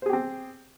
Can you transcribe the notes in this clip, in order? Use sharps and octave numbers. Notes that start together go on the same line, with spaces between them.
C4 G4 G#4 C5